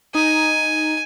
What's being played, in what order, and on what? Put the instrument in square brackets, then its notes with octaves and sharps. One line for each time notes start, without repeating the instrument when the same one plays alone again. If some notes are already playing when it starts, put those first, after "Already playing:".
[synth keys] D#4 [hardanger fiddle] G#5